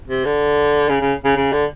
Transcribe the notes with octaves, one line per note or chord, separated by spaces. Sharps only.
C3
D3
C#3
C#3
C#3
C#3
D3